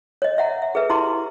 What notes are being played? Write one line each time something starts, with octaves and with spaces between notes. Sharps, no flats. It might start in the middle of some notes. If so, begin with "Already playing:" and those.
C#5 D#5
D#5 E5 F#5 A#5
E5
G#4 A4 B4 E5
E4 G4 A#5 C6 D6